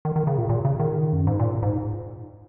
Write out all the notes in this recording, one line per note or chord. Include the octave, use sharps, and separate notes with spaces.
D#3
D#3
C#3
A#2
A#2
C#3
D#3
F#2
G#2
A#2
G#2